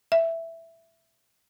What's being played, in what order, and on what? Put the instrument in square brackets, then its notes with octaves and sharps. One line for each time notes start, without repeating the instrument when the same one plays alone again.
[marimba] E5